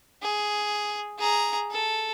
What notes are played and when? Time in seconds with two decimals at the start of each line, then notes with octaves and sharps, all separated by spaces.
0.22 G#4
1.19 G#4 A#5
1.72 A4